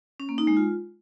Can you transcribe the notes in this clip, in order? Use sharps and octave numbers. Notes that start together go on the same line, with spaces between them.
C#4
A#3
D#4
G#3
F4